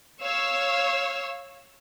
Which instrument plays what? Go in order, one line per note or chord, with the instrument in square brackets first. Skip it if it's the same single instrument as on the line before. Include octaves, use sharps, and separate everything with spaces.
[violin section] C#5 F5 E6